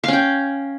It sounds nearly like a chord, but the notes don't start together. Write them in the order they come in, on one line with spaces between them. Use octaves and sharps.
F5 C#4 G5